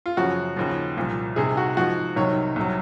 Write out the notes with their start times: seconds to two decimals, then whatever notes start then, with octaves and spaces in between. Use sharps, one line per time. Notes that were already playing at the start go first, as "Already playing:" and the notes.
0.06 F4
0.17 F#2 C#3 F3 F#4
0.56 D#2 C#3 F3
0.97 C2 A#2 F3
1.36 C2 C3 D#3 G#4
1.57 F#4
1.77 G#2 F3 F#4
2.16 C2 C3 D#3 F#3 C#5
2.56 C2 C3 F#3